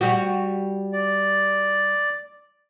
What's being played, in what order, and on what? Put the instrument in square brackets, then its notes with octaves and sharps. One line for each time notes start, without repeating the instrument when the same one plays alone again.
[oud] G3 F#4
[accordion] D5